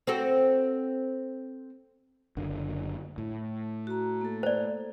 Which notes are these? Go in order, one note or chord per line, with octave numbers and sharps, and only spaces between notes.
C4 F#4 A4
F#1 D3
A2
F#4 A#5
A#3 A4
C5 D5